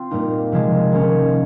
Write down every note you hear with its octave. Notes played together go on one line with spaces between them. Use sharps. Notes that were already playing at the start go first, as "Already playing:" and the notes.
Already playing: C4 F4
A#2 G3 A#3 D#4
C3 F3 G#3
D#3 A#3 C#4